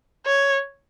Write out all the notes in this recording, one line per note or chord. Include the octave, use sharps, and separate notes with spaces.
C#5